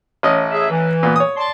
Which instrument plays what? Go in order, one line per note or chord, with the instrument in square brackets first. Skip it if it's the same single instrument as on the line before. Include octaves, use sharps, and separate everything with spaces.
[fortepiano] A1 C#4 D#5
[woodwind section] G#4 E5
E3
[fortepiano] A#2 B3
C#5 D#6
[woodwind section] D5 A5 C6